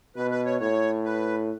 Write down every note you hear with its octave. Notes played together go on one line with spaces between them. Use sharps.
B2 B4
B4
C#5
A2 C#5
B4